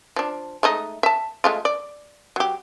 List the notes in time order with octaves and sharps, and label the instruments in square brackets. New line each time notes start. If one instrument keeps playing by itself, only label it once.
[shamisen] F3 D4
G#3 A3 D#4
E5 A5
G#3 A3 F4
D5
F#3 G4